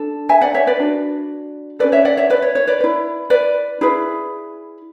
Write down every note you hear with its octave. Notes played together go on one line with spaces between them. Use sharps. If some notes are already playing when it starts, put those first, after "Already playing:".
Already playing: D4 A4
E5 G#5
D5 F#5
C#5 E5
B4 D5
D4 F#4 B4
C#4 F#4 A4 B4 D5
C#5 E5
D5 F#5
C#5 E5
B4 D5
C#5
C#5
B4 D5
E4 B4
B4 D5
E4 G#4 B4